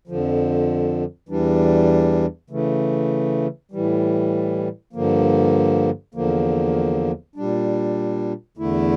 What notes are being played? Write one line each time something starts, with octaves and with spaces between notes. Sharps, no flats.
F2 D3 F3
E2 E3 G3 D4
C#3 E3 A3
A2 E3 G3
G2 D3 F3 A#3
E2 D3 F3 A#3
A#2 G3 D4
E2 D3 A3 E4